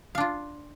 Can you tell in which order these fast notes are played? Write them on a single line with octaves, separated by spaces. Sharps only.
F5 D4 F4